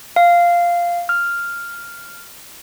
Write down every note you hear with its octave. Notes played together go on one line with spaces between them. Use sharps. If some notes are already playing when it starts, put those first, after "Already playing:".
F5
F6